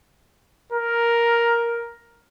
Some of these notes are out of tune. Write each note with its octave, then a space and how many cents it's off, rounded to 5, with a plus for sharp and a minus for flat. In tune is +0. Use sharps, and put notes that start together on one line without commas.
A#4 +5